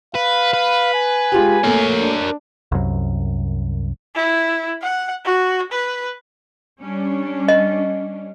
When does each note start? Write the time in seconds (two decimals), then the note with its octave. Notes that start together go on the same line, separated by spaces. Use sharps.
0.15 B4 F5
0.53 B4
0.94 G#5
1.32 G#3 F4 G4
1.64 A3 A#3 A#4 C#5
2.01 D4
2.72 C2 F#2
4.15 E4
4.82 F#5
5.25 F#4
5.72 B4
6.81 G3 C#4 D4
7.48 D#5